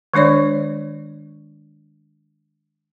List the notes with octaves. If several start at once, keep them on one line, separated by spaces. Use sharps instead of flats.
D#3 G#3 D4 C#5 D5